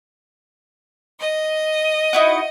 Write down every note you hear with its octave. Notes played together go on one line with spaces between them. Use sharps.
D#5
D#4 E4 F#4